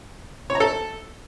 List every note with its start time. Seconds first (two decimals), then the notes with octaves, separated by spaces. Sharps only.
0.50 C#5
0.55 A#5
0.60 A4